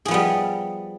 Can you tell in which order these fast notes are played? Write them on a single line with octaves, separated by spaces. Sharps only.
G#4 F3 B3 G3